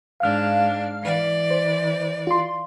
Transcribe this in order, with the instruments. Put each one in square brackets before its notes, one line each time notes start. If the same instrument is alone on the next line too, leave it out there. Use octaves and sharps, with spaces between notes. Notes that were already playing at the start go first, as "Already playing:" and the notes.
[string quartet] G#2 D4 [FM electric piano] F5 F6
[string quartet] E3 D5
[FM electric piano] C5
F4 C6